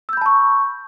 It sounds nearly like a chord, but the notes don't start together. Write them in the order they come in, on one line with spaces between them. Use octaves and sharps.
E6 G6 B5 A5 C#6